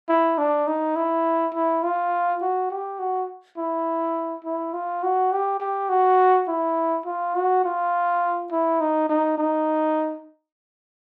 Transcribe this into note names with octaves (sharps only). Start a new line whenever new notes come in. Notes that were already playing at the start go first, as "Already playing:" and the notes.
E4
D4
D#4
E4
E4
F4
F#4
G4
F#4
E4
E4
F4
F#4
G4
G4
F#4
E4
F4
F#4
F4
E4
D#4
D#4
D#4